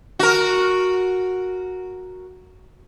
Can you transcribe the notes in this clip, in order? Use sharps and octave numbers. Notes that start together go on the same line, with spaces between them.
F#4 A#4